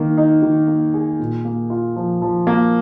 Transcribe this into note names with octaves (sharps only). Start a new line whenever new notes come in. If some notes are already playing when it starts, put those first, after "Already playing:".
Already playing: D#3 A#3
D#4
D#3
A#3
G#4
A#2
A#3
F4
F3
F3
A#3